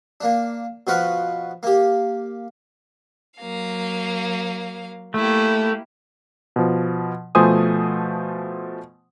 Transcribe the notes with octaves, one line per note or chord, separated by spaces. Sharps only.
A#3 D4
B2 F3 F#4 B4 F5
A#3 G4
F#3 A#3 F5
A3 A#3 E4 G4
B2 F3
B2 F3 A3 C5 G#5 D#6